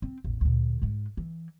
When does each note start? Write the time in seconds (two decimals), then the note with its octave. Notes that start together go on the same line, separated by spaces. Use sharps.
0.02 C4
0.24 A1 E2
0.41 D2 A#2
0.82 G#2 G#3
1.17 E3